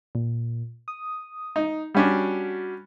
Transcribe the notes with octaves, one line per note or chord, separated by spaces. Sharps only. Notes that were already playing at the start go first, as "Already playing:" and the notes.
A#2
D#6
D#4
G3 C#4 D4 F#4